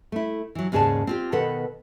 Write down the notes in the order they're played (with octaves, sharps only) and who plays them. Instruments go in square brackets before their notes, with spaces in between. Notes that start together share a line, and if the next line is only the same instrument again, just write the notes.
[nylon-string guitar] A3 E4
E3 F#3
D#2 G#2 C#3 G#4 D5 A5
C4 F4 G4
B2 D#3 A4 B4 F#5